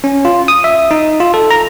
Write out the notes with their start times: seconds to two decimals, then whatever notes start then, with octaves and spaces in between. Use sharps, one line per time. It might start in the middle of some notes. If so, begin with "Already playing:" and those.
0.04 C#4
0.25 F4
0.48 D#6
0.64 E5
0.91 D#4
1.20 F4
1.34 A4
1.51 A#5